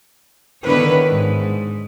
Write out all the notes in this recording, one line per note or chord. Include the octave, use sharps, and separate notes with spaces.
D3 D#3 B3 E4 B4 C#5
G#2